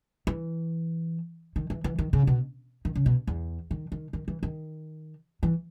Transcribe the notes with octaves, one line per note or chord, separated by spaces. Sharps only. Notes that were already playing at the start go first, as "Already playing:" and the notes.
E3
D#3
E3
E3
D#3
C#3
B2
D#3
C#3
B2
E2
D#3
D#3
D#3
E3
D#3
E3